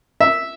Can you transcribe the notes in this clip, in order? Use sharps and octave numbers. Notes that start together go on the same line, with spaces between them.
E5